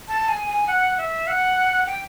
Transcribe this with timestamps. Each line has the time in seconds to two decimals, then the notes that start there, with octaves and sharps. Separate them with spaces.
0.08 A5
0.28 G#5
0.47 G#5
0.68 F#5
0.98 E5
1.27 F#5
1.86 G5